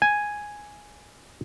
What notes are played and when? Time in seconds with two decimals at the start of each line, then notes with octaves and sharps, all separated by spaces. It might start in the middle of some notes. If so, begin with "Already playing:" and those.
0.02 G#5